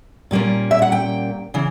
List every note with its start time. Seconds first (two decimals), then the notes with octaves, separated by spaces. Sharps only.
0.31 A#2 G3 A#3 C#4
0.71 E5
0.82 F#5
0.92 G5
1.54 C#3 E3